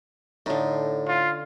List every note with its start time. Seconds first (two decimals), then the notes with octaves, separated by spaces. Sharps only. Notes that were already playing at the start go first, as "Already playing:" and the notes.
0.46 A2 D3 D#4
1.07 F4